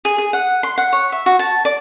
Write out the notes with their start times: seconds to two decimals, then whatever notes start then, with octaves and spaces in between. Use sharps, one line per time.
0.05 G#4
0.18 G#4
0.33 F#5
0.63 C6
0.78 F#5
0.93 C#5
1.12 E5
1.26 F#4
1.39 A5
1.65 D5